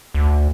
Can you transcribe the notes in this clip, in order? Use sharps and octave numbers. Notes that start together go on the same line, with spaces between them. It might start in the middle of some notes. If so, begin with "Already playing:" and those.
D2